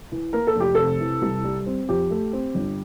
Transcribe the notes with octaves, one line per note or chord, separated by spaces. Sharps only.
E3
A#3 A#4
A4
F1
G4
C3 A4
E3
C2
G3
C4
F2 G4
A3
C4
G1